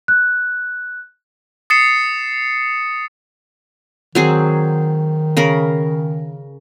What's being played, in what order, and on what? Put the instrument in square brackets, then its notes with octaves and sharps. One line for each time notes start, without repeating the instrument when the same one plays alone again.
[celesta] F#6
[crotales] D#6 A6 C7 C#7 E7
[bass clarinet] D#3 [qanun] F#3 C4 G#4
[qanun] C#3 A#4 B5